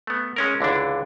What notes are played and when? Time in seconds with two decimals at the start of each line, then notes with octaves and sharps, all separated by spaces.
0.07 A3 B3
0.36 G#3 C#4 A#4
0.61 C#2 D3 E3 D4